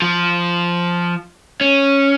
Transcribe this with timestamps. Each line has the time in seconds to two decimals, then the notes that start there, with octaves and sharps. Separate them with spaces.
0.02 F3
1.61 C#4